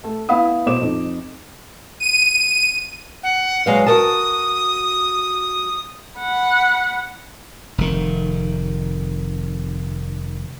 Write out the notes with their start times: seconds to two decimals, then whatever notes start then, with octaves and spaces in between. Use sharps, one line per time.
0.04 A3 A4
0.29 B3 E4 F5 B5 D#6
0.66 B2 C5 D6 E7
0.81 F2 D#4
2.00 D#7
3.23 F#5
3.66 F#3 G#3 B4 F5
3.87 F#4 A#4 A5 D#6
6.19 F#5 B5
7.78 F1 D#3